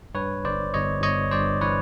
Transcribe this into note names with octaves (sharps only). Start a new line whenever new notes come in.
G2 B4 C#5
G1 C5 D5
G1 C#5 D#5
G1 C#5 D#5
G2 C5 D5
E3 B4 C#5